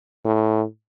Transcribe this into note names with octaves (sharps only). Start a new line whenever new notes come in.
A2